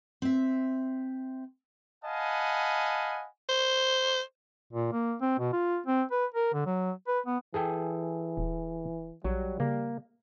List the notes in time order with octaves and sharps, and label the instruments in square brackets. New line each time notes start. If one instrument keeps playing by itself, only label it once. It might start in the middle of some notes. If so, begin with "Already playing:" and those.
[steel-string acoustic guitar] C4 E5
[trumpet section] D#5 F5 F#5 G#5 A5 B5
[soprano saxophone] C5
[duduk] A#2
A#3
C4
B2
F4
C4
B4
A#4
D3
F#3
B4
B3
[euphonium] E3 [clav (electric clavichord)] G#4 A4 G5
[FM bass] D#1
[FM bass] A#1 [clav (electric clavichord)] F#3 [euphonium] G3
[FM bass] C#3 [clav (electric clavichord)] A#3